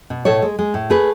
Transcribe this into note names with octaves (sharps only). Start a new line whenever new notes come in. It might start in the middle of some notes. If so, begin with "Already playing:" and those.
B2
A2 A4 C#5
G#3
G#3
A2
A3 G#4 B4